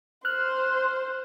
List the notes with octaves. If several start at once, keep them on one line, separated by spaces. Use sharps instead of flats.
C5 F6 F#6